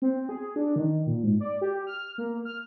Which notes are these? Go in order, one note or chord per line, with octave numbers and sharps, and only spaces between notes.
C4
G#4
D4
D#3
A#2
G#2
D5
G4
F6
A#3
F6